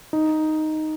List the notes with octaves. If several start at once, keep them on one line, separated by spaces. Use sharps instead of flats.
D#4